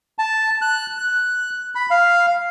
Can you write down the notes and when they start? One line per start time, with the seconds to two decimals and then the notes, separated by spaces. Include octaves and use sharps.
0.18 A5
0.62 F#6
0.98 F#6
1.75 B5
1.90 F5